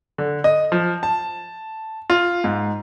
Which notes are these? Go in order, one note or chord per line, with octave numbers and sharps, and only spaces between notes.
D3
D#5
F3
A5
F4
G#2